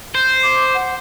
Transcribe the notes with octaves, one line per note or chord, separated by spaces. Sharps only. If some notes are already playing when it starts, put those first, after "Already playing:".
C5
D6
F#5